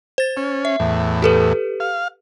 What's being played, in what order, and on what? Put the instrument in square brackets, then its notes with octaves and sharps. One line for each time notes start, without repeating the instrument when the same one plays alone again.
[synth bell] C5 A6
[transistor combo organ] C#4
[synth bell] E5
[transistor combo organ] E2 A2
[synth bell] G4 A4 B4
[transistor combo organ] F5